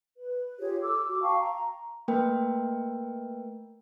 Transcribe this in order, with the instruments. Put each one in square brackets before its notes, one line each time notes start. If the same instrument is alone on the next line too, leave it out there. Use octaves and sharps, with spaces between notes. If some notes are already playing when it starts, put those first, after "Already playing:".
[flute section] B4
F4 G4 G#4 C#5
A4 D6 E6
F#4 D6
F5 G5 A5 C#6
A#5
[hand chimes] A3 A#3 A#4 B4 G5